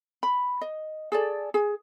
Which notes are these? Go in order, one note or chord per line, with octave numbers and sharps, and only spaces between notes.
B5
D#5
G#4 A4 D5
G#4